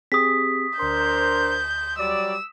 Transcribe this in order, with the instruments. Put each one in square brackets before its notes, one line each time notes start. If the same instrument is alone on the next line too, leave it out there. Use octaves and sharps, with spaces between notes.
[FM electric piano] C4 G4 G#4 [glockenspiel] D#6 B6
[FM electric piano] D2 C6 [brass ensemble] D4 A#4 C5 [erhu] G6
[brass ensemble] F#3 G3 D5 [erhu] E6